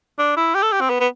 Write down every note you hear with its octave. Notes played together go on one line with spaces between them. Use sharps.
D4
E4
G4
A4
G4
C4
B3
B3